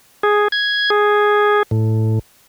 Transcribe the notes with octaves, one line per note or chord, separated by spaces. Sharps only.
G#4
G#6
G#4
A2